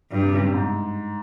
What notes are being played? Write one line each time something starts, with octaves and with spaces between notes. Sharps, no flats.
G2 G3
C3
C#3
C3
G#2